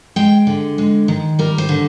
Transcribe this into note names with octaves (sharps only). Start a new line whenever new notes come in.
G#3 G5
D3
G#3
D#3
G3 A#4
C5
D3